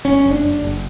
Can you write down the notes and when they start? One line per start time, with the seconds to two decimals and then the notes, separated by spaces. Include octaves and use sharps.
0.05 F#1 C#4
0.24 F#1
0.31 D4
0.44 F#1
0.63 F#1